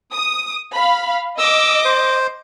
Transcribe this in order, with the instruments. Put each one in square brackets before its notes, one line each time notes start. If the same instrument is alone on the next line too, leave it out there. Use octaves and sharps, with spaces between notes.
[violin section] D#6
F5 B5
[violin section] D#5 D6 [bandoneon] E6
[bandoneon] C5